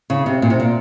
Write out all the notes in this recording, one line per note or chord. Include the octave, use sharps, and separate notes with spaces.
C#3
C3
A#2
C3
A#2